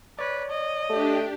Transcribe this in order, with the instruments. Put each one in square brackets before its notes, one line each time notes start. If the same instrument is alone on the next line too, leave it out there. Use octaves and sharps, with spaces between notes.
[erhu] B4 [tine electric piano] C#5 D5
[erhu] D#5
[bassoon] A3 [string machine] D4 G4